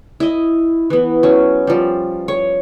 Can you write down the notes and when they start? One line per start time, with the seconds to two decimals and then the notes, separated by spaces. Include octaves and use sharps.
0.20 E4 D#5
0.90 E3 B3
1.23 F#3 C#4
1.67 F3 G3
2.28 C#5